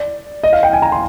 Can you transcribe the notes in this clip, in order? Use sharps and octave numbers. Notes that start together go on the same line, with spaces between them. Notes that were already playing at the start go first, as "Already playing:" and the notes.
Already playing: D5
D#5
F5
G5
G#5
A#5
C6